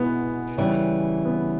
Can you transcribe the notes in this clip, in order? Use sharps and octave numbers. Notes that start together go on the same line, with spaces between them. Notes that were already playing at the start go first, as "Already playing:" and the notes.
Already playing: B2 G#3 B3 E4
C#3 E3 G3
B3